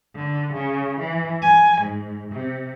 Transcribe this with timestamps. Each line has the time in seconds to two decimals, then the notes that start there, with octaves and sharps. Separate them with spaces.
0.15 D3
0.53 C#3
0.99 E3
1.42 G#5
1.81 G#2
2.33 C3